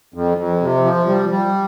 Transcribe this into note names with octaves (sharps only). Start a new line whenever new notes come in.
F2
F2
C3
F3
G3
G3